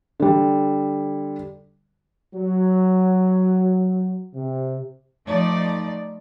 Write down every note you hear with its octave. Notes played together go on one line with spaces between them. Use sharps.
D3 G3
F#3
C3
F3 A3 D#4 D5